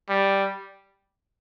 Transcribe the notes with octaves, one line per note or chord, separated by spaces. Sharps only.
G3